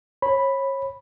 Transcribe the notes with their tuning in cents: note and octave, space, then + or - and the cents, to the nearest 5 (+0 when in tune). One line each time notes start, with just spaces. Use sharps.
C#5 -30 B5 +0